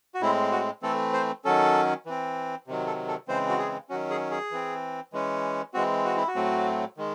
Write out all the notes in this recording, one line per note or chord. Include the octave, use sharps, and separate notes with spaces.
F#4
A2 G#3 C4 E4
F#4
E3 A3 C4 A4
C5
D#3 F#3 C#4 A4
E3 C4
C3 D#3 F#3
A4
A4
C#3 E3 G#3 C4 C5
F#4
G#4
D#3 F#3 C#4 F#4
G#4
G#4
E3 C4
E3 G#3 C#4
E3 G#3 C4 F#4
F#4
E4
F#4
A2 F#3 A3 C4
D#3 G#3